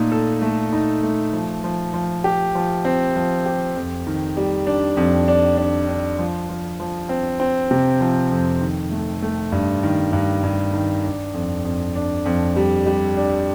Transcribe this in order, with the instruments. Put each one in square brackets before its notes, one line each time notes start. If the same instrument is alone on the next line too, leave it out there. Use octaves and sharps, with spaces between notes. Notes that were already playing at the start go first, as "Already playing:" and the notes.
Already playing: [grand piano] A#2 A3 D#4
A4
A3
D#4
A3
F3
F3
F3
G4
F3
C4
F3
G4
F2
D#3
G3
D4
F2
D4
D4
D4
F3
F3
F3
C4
C4
C3
F3
F2
D#3
A3
A3
G2
D#3
G2
G2
D#3
D4
F2
F2
D4
F2
G3
G3
D4